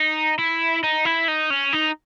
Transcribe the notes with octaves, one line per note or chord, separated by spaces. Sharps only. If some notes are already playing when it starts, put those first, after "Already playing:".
Already playing: D#4
E4
D#4
E4
D#4
C#4
D#4